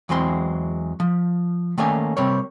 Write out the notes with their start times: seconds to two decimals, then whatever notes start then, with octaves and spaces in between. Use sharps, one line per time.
0.09 E2 E3 F#3 G#3 C4 C6
1.00 F3
1.78 D#3 A3 A#3 C#4 D5 G#5
2.17 C3 G3 C4 A#4 C#5